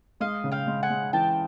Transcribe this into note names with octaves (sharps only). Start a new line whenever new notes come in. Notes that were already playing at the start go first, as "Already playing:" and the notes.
G#3 D#5 F5
C#3
F5 G5
G#3
F#5 G#5
G#3
E3 G5 A5